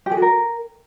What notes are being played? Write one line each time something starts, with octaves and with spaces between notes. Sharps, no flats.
G4
G#4
F#4
A#4